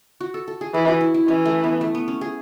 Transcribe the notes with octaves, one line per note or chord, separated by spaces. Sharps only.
F#4
A4
A4
G#4
E3 G#4
F#4
E4
E4
E3 C#4
A3
B3
A3
B3
C#4
G#4